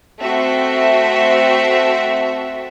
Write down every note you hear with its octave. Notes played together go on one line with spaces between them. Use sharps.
A3 C4 F#4 E5